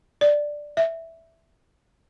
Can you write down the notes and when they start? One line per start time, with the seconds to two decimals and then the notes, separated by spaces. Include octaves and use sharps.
0.21 D5
0.77 E5